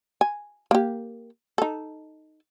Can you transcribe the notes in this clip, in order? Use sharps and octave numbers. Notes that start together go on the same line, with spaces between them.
G#5
A#3 G4
D#4 A4